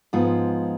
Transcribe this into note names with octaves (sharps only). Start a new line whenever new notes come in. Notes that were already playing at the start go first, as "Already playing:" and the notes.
G#2 F3 B3 F4